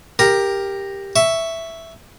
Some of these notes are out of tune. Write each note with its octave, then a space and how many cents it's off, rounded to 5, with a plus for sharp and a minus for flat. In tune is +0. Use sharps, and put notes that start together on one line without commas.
G4 +10 A#4 +0 A#5 +0
E5 +0 C#6 +10